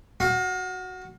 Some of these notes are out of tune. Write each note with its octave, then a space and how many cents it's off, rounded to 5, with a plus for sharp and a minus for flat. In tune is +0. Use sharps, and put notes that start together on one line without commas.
F#4 +0 F5 +35